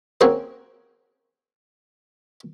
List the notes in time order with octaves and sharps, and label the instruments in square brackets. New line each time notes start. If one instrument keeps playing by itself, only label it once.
[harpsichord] A#3 C4 C#4 F#4 G#4 C5